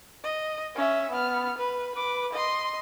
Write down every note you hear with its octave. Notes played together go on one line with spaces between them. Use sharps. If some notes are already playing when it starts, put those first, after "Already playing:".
D#5
C#4 E5
B3 F6
B4
B4 D6
D#5 C6